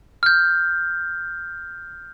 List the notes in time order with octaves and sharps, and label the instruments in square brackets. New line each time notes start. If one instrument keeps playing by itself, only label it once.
[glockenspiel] F6 G6